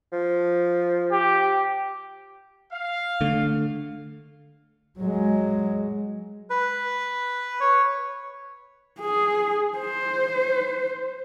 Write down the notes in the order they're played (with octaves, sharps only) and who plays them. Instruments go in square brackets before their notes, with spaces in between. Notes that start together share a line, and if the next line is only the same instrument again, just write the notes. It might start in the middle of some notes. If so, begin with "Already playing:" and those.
[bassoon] F3
[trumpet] G4
[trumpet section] F5
[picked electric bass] D3 A3
[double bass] F#3 G#3
[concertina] B4
C#5
[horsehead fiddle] G#4
C5